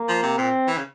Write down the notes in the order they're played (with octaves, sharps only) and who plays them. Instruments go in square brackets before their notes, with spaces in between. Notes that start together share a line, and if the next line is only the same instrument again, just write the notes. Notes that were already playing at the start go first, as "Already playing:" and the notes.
Already playing: [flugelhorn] A#3
[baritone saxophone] F3
C3
[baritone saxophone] A#2 [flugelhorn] C4
[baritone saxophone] E3
C#3